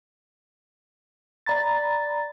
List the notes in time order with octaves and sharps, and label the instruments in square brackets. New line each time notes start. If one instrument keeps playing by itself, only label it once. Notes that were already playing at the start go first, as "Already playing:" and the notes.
[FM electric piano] D5 A#5 B5 A6